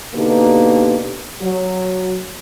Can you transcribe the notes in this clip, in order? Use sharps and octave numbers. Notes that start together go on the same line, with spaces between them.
B2 D3 A#3 D#4 G4 B4
F#3